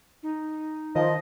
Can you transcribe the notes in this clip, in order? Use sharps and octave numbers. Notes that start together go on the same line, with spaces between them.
D#4
D#3 F3 D#5